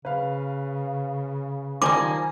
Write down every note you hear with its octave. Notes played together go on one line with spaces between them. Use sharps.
C#3 B4 F5
D#3 F3 G3 A#3 G#5 D6